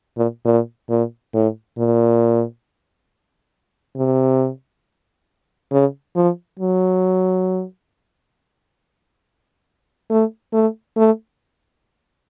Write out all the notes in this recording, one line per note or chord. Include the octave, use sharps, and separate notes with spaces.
A#2
A#2
A#2
A2
A#2
C3
C#3
F3
F#3
A3
A3
A3